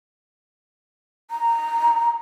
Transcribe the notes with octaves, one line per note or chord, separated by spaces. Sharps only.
A#5